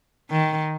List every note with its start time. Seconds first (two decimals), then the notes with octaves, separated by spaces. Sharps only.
0.30 D#3